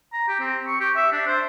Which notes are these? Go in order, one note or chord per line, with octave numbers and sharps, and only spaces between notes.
A#5
G4
C4
C#6
G4
E5
D4
C5